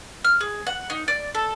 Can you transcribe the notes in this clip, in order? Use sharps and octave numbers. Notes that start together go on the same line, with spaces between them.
F6
G#4
F#5
D#4
D5
A4